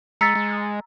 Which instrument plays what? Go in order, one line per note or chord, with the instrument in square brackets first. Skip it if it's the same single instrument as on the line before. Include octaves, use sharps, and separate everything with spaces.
[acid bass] G#3 [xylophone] A#5 E6 B6 [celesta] A6 C#7
[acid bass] G#3